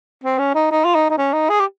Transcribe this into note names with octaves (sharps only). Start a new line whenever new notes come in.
C4
C#4
D#4
D#4
F4
D#4
D#4
C#4
D#4
G#4
G4